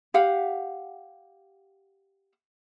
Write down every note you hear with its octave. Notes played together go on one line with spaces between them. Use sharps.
G4 F5 F#5